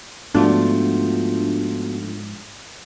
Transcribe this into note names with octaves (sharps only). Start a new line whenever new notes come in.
G#2 F3 A3 B3 D4 F4 F#4